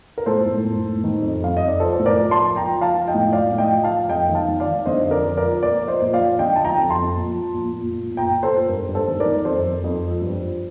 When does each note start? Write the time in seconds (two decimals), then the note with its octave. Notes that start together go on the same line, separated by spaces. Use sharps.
0.18 A#4
0.26 A2 A4 C5
0.46 A2
0.65 A2
0.85 A2
1.04 D#3
1.22 F2
1.42 F2 F5
1.57 F2 D#5
1.68 D5
1.79 F3 A4 C5
1.95 A2 C5
2.06 A#4 D5
2.18 F3
2.31 A5 C6
2.37 F3
2.56 F3 G5 A#5
2.75 F3
2.81 F5 A5
2.94 F3
3.08 D#5 G5
3.14 A2
3.32 F3 D5 F5
3.52 A2
3.58 D#5 G5
3.71 F3
3.83 F5 A5
3.90 F3
4.09 F2 D#5 G5
4.29 D#3
4.35 F5 A5
4.48 D#3
4.60 D5 F5
4.67 D#3
4.86 D3 C5 D#5
5.05 F2
5.11 A#4 D5
5.25 F2
5.37 A#4 D5
5.44 F3
5.62 A#2 A#4 D5
5.82 F3
5.88 C5 D#5
6.02 A#2
6.13 D5 F5
6.20 F3
6.39 D3 D#5 G5
6.56 F3 A5
6.65 G5 A#5
6.78 F2
6.90 A5 C6
6.96 F2
7.16 A#2
7.35 F3
7.54 A#2
7.73 A#2
7.92 A#2
8.11 A#2
8.17 G5 A#5
8.31 A#2
8.43 A4 C5
8.50 A#2
8.69 G2 A#4
8.88 G2
8.95 A4 C5
9.08 D#3
9.20 A#4 D5
9.26 D#3
9.45 F2 A4 C5
9.65 F2
9.84 F2
10.03 F3
10.21 G2
10.42 F3